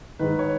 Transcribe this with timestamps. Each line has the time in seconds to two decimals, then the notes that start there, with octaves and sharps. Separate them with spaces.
0.19 G#2 D#3 B4
0.39 C#5